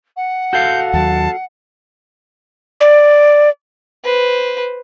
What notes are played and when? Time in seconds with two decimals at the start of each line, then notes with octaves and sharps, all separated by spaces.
0.16 F#5
0.53 F#4 A4 F5 G6
0.94 D#2 F#3 A5
2.80 D5
4.04 B4 C5